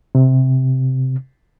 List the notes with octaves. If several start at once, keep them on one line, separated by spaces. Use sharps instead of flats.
C3